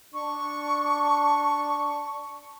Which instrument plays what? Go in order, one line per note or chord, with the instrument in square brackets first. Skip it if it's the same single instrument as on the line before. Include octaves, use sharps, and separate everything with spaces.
[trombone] D4 [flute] C#6